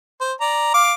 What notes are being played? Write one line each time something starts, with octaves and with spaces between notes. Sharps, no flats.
C5
D5 A#5
F5 D6